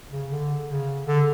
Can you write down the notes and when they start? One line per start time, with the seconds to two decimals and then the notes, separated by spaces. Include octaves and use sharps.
0.12 C#3
0.30 D3
0.68 C#3
1.06 D3